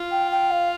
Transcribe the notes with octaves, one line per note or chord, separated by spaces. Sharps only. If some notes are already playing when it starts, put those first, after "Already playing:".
Already playing: F4
G5
G5
F5